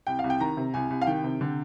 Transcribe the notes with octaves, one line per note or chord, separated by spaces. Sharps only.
C2 G5
F5
C2
G5
D#3 A#5
C3
C2 G#5
C2
F5
D#3 G5
C3
D3